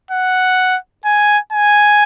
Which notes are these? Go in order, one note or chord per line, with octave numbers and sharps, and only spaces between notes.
F#5
G#5
G#5